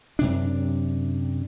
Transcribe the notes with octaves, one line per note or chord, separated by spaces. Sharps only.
F#2 C3 D4